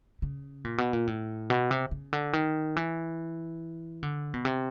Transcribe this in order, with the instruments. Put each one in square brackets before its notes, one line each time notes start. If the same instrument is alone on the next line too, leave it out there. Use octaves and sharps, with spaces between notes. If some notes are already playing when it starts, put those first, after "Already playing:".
[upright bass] C#3
A#2
B2
A#2
A2
B2
C3
C#3
D3
D#3
E3
D3
B2
C3